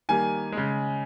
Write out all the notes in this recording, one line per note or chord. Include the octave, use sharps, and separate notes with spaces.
D#3 G3 A#3 G#5
C#3 G#3